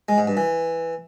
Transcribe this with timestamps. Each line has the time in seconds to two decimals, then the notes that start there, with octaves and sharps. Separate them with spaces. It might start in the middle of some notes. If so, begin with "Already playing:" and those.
0.09 G#3
0.18 G#2
0.27 G2
0.37 E3